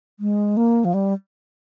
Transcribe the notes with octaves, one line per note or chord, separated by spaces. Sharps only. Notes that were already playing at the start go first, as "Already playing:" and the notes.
G#3
A#3
F3
G3